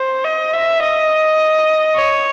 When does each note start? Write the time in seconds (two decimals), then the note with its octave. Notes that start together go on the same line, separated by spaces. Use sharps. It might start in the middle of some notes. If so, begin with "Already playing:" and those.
Already playing: C5
0.25 D#5
0.54 E5
0.82 D#5
1.95 C#5